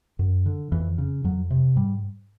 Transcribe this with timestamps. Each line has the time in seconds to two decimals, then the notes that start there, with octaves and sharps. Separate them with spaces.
0.19 F#2
0.46 D3
0.72 F2 E3
0.98 C#3
1.24 F2 F#3
1.50 C3
1.76 G#2 G3